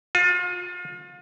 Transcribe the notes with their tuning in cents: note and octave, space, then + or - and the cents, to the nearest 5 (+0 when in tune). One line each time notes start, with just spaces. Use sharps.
F4 +35